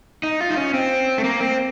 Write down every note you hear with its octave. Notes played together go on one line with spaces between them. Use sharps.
D#4
F4
D#4
C#4
C4
A3
A#3
C4